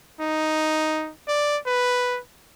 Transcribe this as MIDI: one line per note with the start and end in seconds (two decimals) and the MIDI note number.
0.21 1.11 63
1.28 1.58 74
1.66 2.20 71